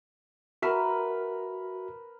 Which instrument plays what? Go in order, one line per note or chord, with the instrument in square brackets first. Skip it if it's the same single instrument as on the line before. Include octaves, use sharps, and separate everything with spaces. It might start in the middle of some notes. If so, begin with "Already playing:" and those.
[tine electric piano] F#4 E5 F6 [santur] A#4 B4